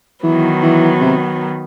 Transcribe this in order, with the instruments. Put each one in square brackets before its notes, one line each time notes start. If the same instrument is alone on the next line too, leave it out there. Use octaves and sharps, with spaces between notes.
[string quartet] D#3 F#3 B3 [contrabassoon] E3
[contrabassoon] E3
C3